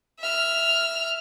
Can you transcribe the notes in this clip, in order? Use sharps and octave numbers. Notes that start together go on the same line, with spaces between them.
E5 F6